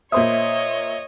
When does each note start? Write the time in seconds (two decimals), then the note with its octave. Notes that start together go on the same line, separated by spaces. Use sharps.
0.12 A#2 C5 C#5 D#5 E5 D#6